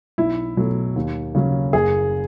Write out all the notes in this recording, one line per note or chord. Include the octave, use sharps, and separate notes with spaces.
B1 E4
B2 F#3 A3
D#2
C#3 F#3 C#4
F#1 G#4